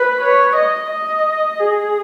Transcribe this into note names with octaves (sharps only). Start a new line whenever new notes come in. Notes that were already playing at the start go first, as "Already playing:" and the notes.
Already playing: B4
C#5
D#5
D#5
G#4